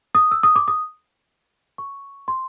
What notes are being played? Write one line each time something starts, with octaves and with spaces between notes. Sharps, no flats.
D#6
E6
D#6
D6
D#6
C#6
C6